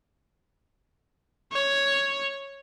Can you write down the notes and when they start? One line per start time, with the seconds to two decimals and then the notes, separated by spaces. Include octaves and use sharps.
1.52 C#5